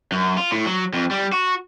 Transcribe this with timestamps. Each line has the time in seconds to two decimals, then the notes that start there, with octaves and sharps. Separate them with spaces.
0.12 F#2
0.37 F4
0.52 A2
0.66 F#3
0.93 F2
1.11 G3
1.32 F#4